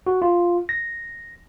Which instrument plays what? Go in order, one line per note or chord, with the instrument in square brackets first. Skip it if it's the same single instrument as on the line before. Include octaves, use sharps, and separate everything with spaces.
[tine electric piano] F#4
F4
A#6